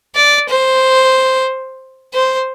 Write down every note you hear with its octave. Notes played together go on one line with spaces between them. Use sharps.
D5
C5
C5